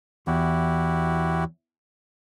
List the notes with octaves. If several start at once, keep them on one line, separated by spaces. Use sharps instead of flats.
E2 E4 F#4 G4